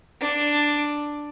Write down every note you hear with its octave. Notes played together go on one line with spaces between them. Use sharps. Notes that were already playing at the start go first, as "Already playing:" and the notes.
D4